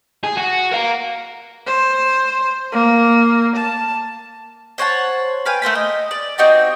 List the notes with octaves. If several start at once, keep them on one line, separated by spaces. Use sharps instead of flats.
G#4
F#4
A#4 F5
C5
A#3
A5
C5 C#5 F#5 A5
B4 F5 G5 G#5
A3 A#4 C5 B5
D#5
D5
C4 D#4 F#4 G4